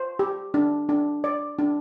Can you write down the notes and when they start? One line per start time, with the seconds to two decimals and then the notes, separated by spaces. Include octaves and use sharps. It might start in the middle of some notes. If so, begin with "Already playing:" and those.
Already playing: C5
0.19 G4
0.54 D4
0.89 D4
1.24 D5
1.59 D4